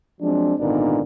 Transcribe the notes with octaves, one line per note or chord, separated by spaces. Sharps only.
F3 F#3 G#3 C4 D4
G#1 A#2 D3 B3 D4 D#4